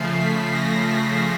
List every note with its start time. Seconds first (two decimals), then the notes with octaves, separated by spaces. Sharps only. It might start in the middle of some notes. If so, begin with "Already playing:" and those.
Already playing: C#3 F3 A3 C7
0.21 B6
0.55 A#6
0.90 B6